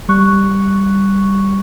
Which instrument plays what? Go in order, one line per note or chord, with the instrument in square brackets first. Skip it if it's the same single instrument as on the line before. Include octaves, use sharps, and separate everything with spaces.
[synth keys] G3 C#6 F#6